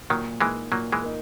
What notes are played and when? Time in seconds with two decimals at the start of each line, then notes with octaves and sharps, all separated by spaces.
0.10 A#2 D#3 F#3
0.40 E3 G#3 A#3 D#4
0.71 A#2 F#3 A#3
0.92 E3 G#3
1.03 A#3 D#4